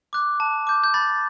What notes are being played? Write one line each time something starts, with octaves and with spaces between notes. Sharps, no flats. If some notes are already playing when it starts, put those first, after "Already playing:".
D6 F#6
A5
D6 G6
G6
B5 A6